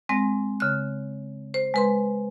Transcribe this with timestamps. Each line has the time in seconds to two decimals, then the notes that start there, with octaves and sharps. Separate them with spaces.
0.09 G#3 C4 A#6
0.60 C#3 F#6
1.54 C5
1.74 G#3 B4 C6